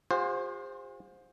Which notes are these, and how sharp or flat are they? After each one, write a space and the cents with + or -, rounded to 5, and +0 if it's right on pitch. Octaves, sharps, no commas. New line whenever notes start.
F4 +45 G#4 -45 C5 +5